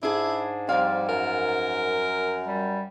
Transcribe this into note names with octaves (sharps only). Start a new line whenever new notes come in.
G#2 D4 E4 G#4
F2 G3 C4 F5
F#2 A#4
G3